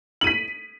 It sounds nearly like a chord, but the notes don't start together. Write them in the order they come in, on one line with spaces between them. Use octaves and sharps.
F#7 D#7 B6